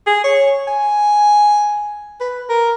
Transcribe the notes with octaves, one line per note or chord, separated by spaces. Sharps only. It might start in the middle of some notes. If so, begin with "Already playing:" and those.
G#4
C#5
G#5
B4
A#4